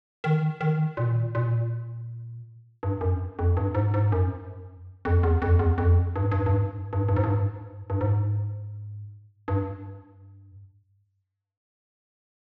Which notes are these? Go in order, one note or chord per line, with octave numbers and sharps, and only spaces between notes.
D#3
D#3
A#2
A#2
G2
F#2
F2
G2
G#2
G#2
F#2
F2
E2
F2
E2
F2
G2
G#2
G2
G#2
G2
G#2
G2
G#2
G2
G#2
G2
G#2
G2
G#2
G2
G#2
G2
G2
G#2
G2